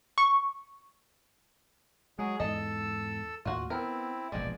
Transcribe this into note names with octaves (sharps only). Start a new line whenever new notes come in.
C#6
F#3 G#3 G#4
E2 G#2 A4 D#5 E6
D#2 A2 F4 F#4
B3 C4 E4 A#4
E1 A#1 G#2 G#3 D5